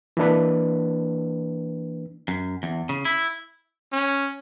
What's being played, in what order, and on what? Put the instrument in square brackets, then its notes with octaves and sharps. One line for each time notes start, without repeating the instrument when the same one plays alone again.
[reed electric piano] E3 A#3 D4 B4
[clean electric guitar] F#2
E2
C#3
E4
[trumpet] C#4